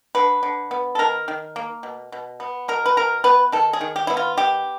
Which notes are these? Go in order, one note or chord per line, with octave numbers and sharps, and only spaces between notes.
D3 B4
D3
B3
A4
D#3 A#4
D#3
A#3
B2
B2
B3
B2 A#4
B4
B2 A#4
B3 B4
D#3 A4
G#4
D#3
G4
B3 E4
F4
D#3 G4